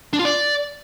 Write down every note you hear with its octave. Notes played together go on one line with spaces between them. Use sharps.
D4
F4
D5